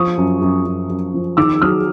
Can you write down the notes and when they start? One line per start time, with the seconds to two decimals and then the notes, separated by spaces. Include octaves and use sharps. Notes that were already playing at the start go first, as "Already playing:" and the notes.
Already playing: F3 C#6 D#6
0.18 F#2
0.41 F#2
0.65 F#2
0.90 F#2
1.14 F3
1.37 D#3 D6 E6
1.62 F#3 D#6 F6